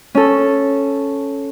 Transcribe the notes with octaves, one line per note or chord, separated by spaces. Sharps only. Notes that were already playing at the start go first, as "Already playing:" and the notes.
C#4 A4